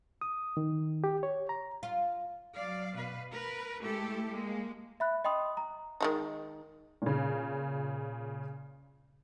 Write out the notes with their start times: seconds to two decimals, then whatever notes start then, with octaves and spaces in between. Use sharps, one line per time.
0.21 D#6
0.57 D#3
1.04 G4
1.23 C#5
1.49 A#5
1.83 F4
2.54 F#3 D5 F5
2.95 B2 B4 F5
3.31 A#4 B4
3.81 G#3 A3 E4 G4 A4
4.31 G#3 A#3
5.00 E5 B5 F#6
5.24 D#5 G5 B5 C6 D#6
5.57 A#5
6.01 D#3 G#3 D#4
7.02 A#2 C#3